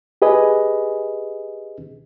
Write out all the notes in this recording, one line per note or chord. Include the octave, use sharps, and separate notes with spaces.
G4 G#4 B4 D#5 G#5